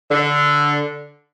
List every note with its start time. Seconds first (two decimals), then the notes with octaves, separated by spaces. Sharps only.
0.11 D3